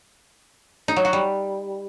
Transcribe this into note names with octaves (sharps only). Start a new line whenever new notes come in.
D#4
F#3
F#4
G3